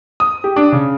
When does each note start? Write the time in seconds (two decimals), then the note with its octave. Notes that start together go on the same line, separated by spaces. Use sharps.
0.20 D#6
0.44 G4
0.56 D4
0.72 C#3